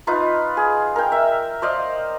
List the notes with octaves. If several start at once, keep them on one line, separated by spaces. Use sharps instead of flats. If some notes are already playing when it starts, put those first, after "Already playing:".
D#4 F4 B4
G#4
A#4 G5
E5
C5 D5 D#5 F5